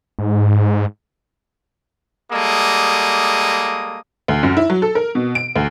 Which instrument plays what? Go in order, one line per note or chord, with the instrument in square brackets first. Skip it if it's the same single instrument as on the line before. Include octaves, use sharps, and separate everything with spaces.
[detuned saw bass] G#2
[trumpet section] G3 G#3 A#3 A4 D#6
[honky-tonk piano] D2
F#2
E4
F#3
A4
A#4
B2
D7
D2